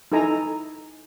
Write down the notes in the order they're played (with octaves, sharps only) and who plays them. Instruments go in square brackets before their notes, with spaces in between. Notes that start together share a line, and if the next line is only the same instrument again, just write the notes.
[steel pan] D#4 E4 A4 G#5 A#5